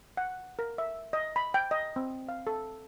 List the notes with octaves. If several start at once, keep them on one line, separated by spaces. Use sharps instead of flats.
F#5
A#4
E5
D#5
B5
G5
D#5
C4
F5
A4